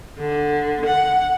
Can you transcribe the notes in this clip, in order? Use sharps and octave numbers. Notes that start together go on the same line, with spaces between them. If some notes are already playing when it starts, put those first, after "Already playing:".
D3
F#5